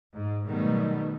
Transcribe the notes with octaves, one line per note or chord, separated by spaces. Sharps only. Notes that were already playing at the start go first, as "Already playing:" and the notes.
G#2
B2 D#3 F#3 G3 A3 B3